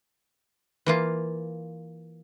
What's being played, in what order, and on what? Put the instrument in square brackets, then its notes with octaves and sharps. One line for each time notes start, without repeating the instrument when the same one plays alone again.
[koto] E3 A#3 F4